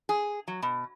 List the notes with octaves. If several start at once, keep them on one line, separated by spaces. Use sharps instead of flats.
G#4
F#3
B2